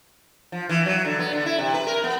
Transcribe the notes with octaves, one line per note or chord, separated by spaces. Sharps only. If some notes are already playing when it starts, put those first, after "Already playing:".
F3
E3
F#3
D3
B3
D3
E4
C3
B4
A#4
B3